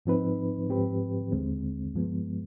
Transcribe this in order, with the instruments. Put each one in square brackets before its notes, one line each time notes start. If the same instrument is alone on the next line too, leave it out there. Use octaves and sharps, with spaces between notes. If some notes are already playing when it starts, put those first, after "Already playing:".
[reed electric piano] G#2 F3 C4 D#4 B4
G#2 F3 C4 G4 B4
D#2 D3 G#3 C4
G2 F3 G#3 B3